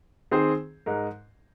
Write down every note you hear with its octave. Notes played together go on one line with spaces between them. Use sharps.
D#3 C4 G#4 C5
G#2 G#3 D#4 A#4